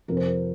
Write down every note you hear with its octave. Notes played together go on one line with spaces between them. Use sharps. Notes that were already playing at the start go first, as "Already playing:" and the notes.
F2 C3 F3 A#4
C5
A#4